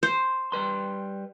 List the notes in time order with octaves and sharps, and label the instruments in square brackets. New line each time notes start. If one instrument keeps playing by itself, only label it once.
[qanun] C5
[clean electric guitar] G3 B4 C6